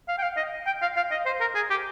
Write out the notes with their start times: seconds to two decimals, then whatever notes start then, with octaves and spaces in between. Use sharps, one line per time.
0.08 F5
0.18 G5
0.23 F5
0.37 D#5
0.66 G5
0.82 F5
0.97 F5
1.11 D#5
1.26 C5
1.41 A#4
1.55 G#4
1.70 G4